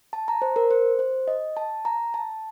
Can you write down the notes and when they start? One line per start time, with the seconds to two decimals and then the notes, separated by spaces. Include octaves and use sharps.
0.13 A5
0.28 A#5
0.42 C5
0.56 A#4
0.71 C5
0.99 C5
1.28 D#5
1.57 A5
1.85 A#5
2.14 A5